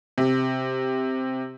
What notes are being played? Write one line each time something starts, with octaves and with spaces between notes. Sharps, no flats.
C3